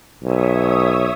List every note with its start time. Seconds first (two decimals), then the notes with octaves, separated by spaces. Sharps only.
0.24 B1 C#5 E5 D#6